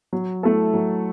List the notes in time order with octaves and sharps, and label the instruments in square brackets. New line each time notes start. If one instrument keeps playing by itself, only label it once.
[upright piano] F#3
A3 E4 A4
F#3